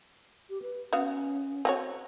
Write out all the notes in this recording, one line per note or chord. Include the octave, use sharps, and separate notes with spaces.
G4
B4
B3 C#4 F#4 F5
C4 F#4 C#5